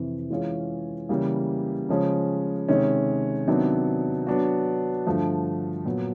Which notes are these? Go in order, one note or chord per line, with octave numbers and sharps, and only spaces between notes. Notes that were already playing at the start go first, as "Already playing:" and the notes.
Already playing: F2 C3 E3
E3 G#3 C#4 F4 G#4
C#3 E3 G3 A#3
C#3 F3 G#3 C#4
C3 D#3 G#3 C#4
C3 D#3 F#3 B3 D4
F#3 B3 D4 F#4
G2 D3 F3 A3
A#2 F#3 B3